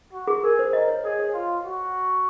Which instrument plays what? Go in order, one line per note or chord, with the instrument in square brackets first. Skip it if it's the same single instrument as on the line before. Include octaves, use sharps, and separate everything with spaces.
[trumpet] F#4
[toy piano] G#4
[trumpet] G#4 [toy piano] A#4
[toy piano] C5
[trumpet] A#4 [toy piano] D#5
[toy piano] C#5
[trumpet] G#4 [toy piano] D#5
[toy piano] C#5
[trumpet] F4
F#4